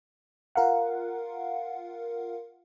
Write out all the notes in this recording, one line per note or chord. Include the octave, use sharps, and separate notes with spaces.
F4 A#4 F5 F#5